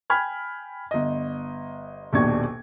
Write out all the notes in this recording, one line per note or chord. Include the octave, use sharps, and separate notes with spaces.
G5 G#5 B5 F6 G#6
G1 D#5
D#1 A#1 B2 D4 C#6 G#6